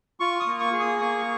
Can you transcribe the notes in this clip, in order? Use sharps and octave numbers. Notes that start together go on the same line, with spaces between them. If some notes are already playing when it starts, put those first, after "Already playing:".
F4 C#6
D#6
A#3
C#6
G#4
D#6
A#3 C#6